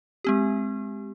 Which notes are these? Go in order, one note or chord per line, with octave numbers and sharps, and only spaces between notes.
G#3 C4 G4